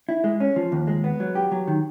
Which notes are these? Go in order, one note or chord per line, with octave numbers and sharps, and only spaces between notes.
E4
G#3
C#4
F3
D#2
G#3
B3
F#3
G4
F#3
D#3